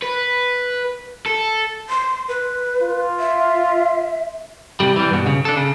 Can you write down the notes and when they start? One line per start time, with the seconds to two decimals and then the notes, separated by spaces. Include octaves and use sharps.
0.02 B4
1.26 A4
1.89 C6
2.29 B4
2.82 F4
3.20 E5
4.80 C3 G3
4.96 E3 G3
5.10 G2 B2
5.26 C#3
5.45 D4 A4
5.57 C#3